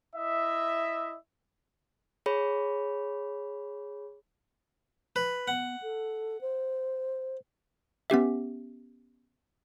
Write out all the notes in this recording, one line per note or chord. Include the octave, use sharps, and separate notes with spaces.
E4 D#5 E5
G#4 C#5 B5
B4
B3 F#5
A4
C5
B3 C#4 G4 E5